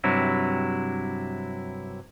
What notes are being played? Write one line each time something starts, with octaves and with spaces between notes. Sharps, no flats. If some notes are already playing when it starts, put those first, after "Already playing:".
G2 C3 F#3 E4